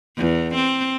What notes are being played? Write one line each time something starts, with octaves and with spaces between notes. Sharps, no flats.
E2
C4